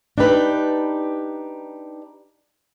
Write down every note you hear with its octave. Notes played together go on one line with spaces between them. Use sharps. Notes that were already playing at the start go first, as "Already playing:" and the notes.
D4 D#4 G4 B4